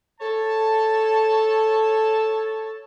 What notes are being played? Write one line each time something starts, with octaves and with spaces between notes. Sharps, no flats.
A4 C#5 A5